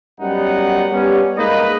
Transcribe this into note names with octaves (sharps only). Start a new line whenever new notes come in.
F#2 G3 B3 D#4 F#5
G3 B3 C#4
G#3 A#3 D#4 B4 D#5